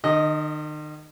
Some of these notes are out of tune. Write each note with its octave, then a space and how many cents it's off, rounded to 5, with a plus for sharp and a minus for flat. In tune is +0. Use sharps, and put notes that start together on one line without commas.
D#3 -40 D#5 +0